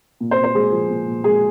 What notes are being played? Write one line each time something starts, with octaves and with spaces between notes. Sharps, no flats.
A#2
C5
A#2
C5
G#3 G#4
F3
A#2
A#2
G#3 G#4